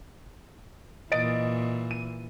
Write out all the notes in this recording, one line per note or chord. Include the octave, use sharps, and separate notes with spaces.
A#2 E3 D#5 A6 D7
D#7